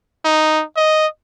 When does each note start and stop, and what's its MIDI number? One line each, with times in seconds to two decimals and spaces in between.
0.25 0.64 63
0.76 1.07 75